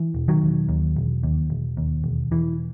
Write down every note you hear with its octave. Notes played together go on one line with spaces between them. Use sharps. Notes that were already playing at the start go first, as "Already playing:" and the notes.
Already playing: E3
E1
D#3 F#3
E1
D#2
E1
D#2
E1
D#2
E1
E1 E3